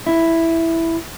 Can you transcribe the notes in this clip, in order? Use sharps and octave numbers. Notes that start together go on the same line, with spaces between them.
E4